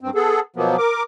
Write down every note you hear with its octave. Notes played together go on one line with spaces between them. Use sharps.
G2 C4
B3 G#4 A4
B2 F3 F#3 A#3 B3
A#4 D6